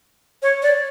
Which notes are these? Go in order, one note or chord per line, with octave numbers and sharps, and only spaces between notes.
C#5
D5